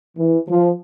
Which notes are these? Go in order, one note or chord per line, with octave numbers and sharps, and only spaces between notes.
E3
F3